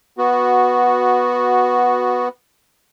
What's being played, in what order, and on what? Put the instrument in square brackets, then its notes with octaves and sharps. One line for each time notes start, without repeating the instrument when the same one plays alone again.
[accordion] B3 F#4